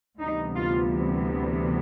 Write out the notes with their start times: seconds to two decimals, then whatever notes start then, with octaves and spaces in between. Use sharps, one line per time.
0.21 D2 C3 E3 G3 B3 D#4
0.55 F4